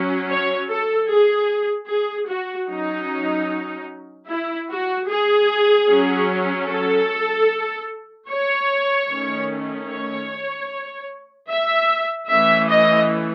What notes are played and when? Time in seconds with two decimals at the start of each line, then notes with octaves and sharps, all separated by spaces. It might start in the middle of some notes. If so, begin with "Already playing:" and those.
Already playing: F#3 C#4
0.28 C#5
0.69 A4
1.09 G#4
1.89 G#4
2.29 F#4
2.69 F#3 C#4 D#4
4.28 E4
4.69 F#4
5.08 G#4
5.88 F#3 C#4
6.69 A4
8.29 C#5
9.09 D#3 A3 C#4
9.89 C#5
11.49 E5
12.29 E3 A3 C#4 E5
12.69 D#5